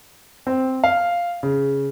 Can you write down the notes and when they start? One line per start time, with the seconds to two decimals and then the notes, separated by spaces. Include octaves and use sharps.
0.47 C4
0.84 F5
1.43 C#3